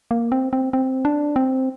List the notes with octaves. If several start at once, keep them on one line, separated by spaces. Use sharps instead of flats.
A#3
C4
C4
C4
D4
C4